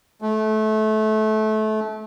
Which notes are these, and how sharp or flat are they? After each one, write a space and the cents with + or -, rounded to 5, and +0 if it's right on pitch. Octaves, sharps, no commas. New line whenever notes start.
A3 -25